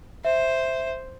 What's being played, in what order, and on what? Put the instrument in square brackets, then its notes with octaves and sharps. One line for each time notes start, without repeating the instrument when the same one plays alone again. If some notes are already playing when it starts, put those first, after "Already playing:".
[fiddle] C5 [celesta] E5